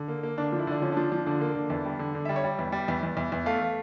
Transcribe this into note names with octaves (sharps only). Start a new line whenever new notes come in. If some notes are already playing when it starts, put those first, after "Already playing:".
Already playing: D3
A#3
A#3
D3 D4
F3
E4
D3 D4
F3 C#4
F3 D4
F3
D3 D4
A#3
D3
E2
G3
D3
D3
G3 E5
C#5
G3
E2
G3
E2
E2
E2
E2
A3 F5
A3